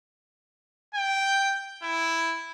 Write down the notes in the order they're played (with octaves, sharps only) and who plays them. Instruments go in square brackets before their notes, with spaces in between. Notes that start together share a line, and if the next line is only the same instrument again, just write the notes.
[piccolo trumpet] G5
E4